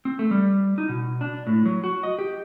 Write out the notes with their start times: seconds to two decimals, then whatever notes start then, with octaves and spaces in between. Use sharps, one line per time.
0.05 C4
0.19 A3
0.31 G3
0.78 D#4
0.89 B2
1.21 D4
1.47 A2
1.66 F#3
1.84 F#4
2.03 D#5
2.19 G4